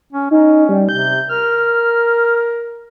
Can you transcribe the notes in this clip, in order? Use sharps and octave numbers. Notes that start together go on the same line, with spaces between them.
C#4
C#4 D#4
G3
C3 G6
A#4 F6